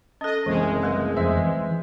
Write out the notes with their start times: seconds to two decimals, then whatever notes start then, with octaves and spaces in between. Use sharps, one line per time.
0.21 C#4 A4 D#5
0.46 F#1 C2 E3 G#3
0.82 G3 A3 B4
1.16 F2 C5 E5
1.37 E3